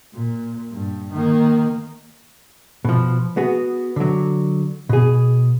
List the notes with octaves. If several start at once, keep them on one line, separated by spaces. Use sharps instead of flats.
A#2
G2
D#3 A#3
B2 F3
B3 F#4 G#4
D3 F#3
B2 G#4